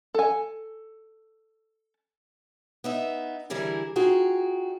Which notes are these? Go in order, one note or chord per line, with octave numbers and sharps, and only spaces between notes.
A4 G#5
B3 D#4 E5
D3 E3 G3 E4 G#4 A#4
D#4 F4 F#4 G#4 G5